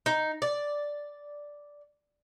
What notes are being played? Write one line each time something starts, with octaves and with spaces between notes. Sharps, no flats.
D#4
D5